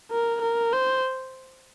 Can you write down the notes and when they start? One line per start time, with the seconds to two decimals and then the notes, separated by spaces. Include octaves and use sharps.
0.12 A#4
0.42 A#4
0.73 C5